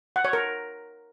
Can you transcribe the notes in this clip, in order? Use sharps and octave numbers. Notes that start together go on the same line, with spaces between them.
F#5
C#5
A#4